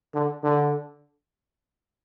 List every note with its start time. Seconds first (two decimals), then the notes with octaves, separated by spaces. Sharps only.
0.14 D3
0.43 D3